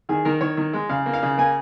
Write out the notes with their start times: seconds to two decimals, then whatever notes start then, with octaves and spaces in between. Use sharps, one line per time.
0.09 D#3 G#4
0.25 D#3 A#4
0.41 D#3 C#5
0.57 D#3
0.73 G#3
0.89 C#3 F5
1.06 A#3
1.13 F5
1.23 C#3
1.38 A#3 G#5